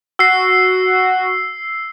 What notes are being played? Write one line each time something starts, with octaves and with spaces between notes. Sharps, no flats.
F#4 E6 C7